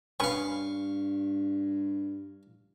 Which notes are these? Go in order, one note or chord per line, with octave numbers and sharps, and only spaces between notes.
G2 B3 C#4 B4 F5 C#6